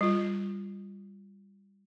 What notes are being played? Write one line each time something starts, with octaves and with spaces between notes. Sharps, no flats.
G3 F4